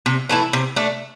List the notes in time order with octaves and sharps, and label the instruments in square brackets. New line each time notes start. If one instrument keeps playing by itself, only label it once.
[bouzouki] C3
E3 A3 E4
C3
A3 D4